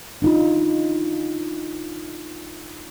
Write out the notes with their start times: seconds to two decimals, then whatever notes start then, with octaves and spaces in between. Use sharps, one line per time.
0.22 D4 D#4 F4